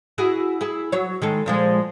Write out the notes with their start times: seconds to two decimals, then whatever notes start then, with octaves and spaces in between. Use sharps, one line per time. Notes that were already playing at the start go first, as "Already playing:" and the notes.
0.18 E4 F#4 G#4
0.61 E4 G#4
0.92 F#3 C#5
1.22 D#3 G#3 A4
1.46 A#2 F3 G#3